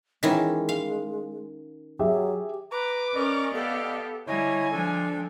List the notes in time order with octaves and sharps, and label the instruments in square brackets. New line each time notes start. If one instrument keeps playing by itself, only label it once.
[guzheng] D#3 E3 C#4 [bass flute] G#3
[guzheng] F5
[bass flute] F#3 [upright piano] G4 G#4 E5
[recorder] B4 [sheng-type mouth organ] A#5 [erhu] D6
[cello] C#4 A#4 [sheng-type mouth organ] D5 D#5
[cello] B3 G4 [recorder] A4 [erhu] F5
[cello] D3 G3 [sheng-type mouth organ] E4 C#5 [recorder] D#5 [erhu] G#5
[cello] F3 G#3 [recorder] D4 [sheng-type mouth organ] A4